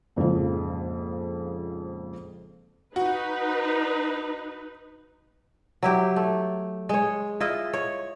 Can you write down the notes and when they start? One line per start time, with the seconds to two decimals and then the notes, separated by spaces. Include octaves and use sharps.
0.16 A#1 F2 G#2 C#3 F3
2.96 D#4 F#4 B4
5.83 F#3 E4 G4
6.16 A3
6.89 G#3 C#5
7.40 E4 F4 D#5
7.73 C#5